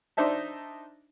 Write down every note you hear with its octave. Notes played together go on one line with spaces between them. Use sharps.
D4 D#4 C5 E5 A5